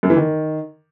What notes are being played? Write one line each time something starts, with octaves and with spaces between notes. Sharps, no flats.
F#2
E3
D#3